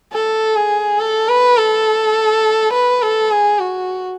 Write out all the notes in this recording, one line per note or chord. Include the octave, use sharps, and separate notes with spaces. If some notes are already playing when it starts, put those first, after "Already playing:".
A4
G#4
A4
B4
A4
B4
A4
G#4
F#4